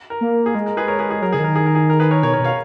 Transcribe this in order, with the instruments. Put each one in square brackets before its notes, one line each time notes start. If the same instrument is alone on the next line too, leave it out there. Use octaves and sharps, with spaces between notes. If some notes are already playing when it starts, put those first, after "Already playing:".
[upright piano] A#4
[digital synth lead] A#3
[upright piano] G#4
[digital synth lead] G#3 [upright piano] A#4
[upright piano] A#4
G#4 B4
A#4 C#5
G#4 B4
G#4
[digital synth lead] F#3 [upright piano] A#4
[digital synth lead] C#3 [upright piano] G#4
[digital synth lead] D#3
[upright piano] A#4
G#4
A#4
G#4
A#4
G#4 B4
A#4 C#5
[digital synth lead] B2 [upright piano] A#4 C#5
[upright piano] A#4 C#5
[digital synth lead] B2
[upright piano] C#5 F5